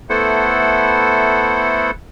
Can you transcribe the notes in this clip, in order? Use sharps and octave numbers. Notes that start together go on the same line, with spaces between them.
A3 B3 E4 A4 C5 F#5